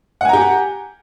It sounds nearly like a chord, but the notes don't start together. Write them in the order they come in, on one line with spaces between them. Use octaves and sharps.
F#5 G#5 A#5 G4